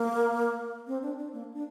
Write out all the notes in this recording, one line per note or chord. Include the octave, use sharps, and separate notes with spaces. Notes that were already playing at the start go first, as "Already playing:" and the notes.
Already playing: A#3
C4
D4
D4
A#3
D4